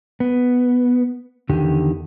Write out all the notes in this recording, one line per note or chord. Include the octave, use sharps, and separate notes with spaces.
B3
E2 D3 D#3 G4